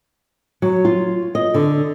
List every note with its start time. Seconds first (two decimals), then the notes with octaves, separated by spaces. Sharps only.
0.62 F#3
0.85 F4
1.35 D#5
1.54 D3